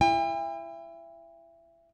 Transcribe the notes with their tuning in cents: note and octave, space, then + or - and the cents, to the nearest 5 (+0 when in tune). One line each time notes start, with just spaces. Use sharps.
E4 +25 G5 +45